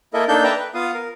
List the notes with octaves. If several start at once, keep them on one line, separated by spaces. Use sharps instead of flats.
A#3 E4 A4 A#4 D#5 E5
A#3 D4 D#4 A4 G6
B4 D5 E5 G5 A5 A#5
B4
B3 F4 F5 D#6
A#4